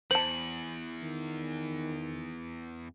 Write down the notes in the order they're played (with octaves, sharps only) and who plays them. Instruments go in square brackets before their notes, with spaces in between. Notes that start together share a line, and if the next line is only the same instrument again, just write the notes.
[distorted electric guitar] E2 [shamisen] C5 A5 [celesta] F#7
[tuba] D#3